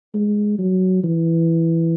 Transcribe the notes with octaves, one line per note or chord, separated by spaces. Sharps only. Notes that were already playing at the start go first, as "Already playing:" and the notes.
G#3
F#3
E3